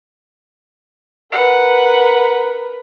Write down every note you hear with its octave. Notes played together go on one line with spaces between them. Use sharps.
A#4 B4 F#5